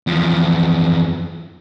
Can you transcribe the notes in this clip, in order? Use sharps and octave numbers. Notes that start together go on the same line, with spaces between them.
E2 F3